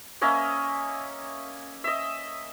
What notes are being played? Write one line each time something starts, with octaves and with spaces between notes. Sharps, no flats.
A#3 C#4 D#5 E5
D#5 E5